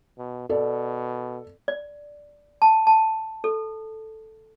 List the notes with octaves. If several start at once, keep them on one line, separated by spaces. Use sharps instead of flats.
B2
B2 A4 D5
D5
A5
A5
A4